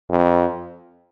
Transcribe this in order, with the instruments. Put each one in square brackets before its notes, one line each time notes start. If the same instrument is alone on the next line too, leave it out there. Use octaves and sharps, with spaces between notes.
[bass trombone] F2